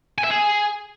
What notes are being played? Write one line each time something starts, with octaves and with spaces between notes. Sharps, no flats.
G#5
E5
G#4